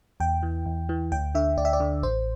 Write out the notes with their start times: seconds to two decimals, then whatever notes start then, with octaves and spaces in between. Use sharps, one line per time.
0.20 E2 G5
0.43 E3
0.66 E2
0.89 E3
1.12 D2 G5
1.35 D3 E5
1.57 D2 D5
1.65 E5
1.73 D5
1.80 D3
2.03 A1 C5